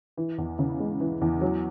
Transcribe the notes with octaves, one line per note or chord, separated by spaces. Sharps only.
E3
E2
C#3
G#3
E3
E2
F#3